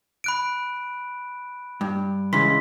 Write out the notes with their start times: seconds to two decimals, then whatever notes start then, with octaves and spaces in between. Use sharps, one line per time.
0.24 B5 F#6 D7
1.81 G2
2.33 C#3 E3 G#3 C6 B6